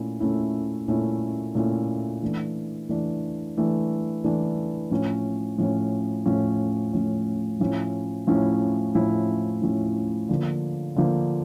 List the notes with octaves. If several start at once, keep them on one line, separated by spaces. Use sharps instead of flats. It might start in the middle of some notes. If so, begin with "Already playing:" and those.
Already playing: A#2 A3 C#4 E4
A#2 A3 C#4 E4
A#2 A3 C#4 E4
A#2 A3 C#4 E4
E3 A3 D4
E3 A3 D4
E3 A3 D4
E3 A3 D4
A2 F3 C#4
A2 F3 C#4
A2 F3 C#4
A2 F3 C#4
A2 F3 C#4 E4
A2 F3 C#4 E4
A2 F3 C#4 E4
A2 F3 C#4 E4
D3 F3 A#3
D3 F3 A#3